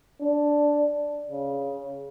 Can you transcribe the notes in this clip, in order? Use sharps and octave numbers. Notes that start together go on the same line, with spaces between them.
D4
C#3